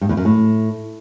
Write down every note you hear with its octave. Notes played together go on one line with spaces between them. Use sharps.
G2
E2
F#2
A2